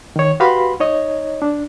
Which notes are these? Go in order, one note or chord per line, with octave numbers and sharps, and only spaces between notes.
D#3 C#5
F#4 G4 B4 F5 B5 C6
D#4 C#5 D#5
D4